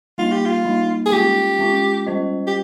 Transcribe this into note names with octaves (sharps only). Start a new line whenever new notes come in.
G3 A#3 D#4 F4
G4
F4
G3 A#3 D#4
G#4
G#3 C#4 F4 G4
G#3 C#4 F4
G3 C#4 F4 C5 D#5
G4